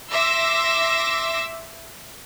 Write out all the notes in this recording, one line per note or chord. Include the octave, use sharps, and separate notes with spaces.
E5 C6 D6 E6 A#6